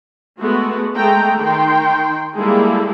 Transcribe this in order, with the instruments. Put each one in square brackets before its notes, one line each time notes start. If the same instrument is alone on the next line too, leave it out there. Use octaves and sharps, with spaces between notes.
[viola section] G#3 A3 B3 F#4
G#3 A3 G#4 G5 A#5
D#3 G5 C6
G3 G#3 A#3 E4 G#4 A4